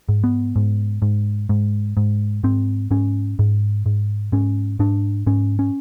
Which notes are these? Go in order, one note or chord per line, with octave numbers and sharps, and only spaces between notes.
G#2
B3
G#2
G#2
G#2
G#2
G#2 C4
G#2 C#4
G#2
G#2
G#2 C#4
G#2 D4
G#2 C#4
C#4